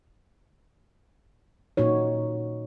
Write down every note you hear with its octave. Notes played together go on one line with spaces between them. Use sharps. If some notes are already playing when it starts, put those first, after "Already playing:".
A#2 D#4 F#4 C#5